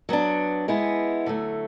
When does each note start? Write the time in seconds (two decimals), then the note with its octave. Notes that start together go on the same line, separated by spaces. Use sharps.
0.09 F#3 B3 D4
0.68 G#3 B3 E4
1.26 D3 F#3 A3